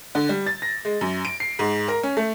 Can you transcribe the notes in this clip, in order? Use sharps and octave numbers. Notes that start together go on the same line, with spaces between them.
D3
G3
A6
A#6
G#3
F#2
D7
C7
G#2
A#4
C#4
A3